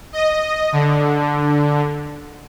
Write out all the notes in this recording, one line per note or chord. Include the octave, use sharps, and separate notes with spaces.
D#5
D3